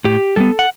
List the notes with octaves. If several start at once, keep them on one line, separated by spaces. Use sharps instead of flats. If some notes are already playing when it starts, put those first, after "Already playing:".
A2 G4
G3 B3 A4
F#5